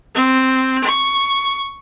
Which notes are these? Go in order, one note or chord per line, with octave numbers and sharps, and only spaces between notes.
C4
C#6